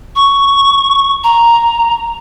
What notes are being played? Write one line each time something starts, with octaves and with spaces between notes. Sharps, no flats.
C#6
A#5